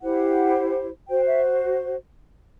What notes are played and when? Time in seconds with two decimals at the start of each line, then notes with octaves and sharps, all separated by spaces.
0.02 E4 G4 C5 F#5
1.09 F#4 C5 G5
1.27 E5